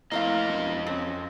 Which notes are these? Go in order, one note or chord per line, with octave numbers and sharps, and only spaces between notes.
F2 A2 A#3 C4 D#5 F5
E1
C#3 C4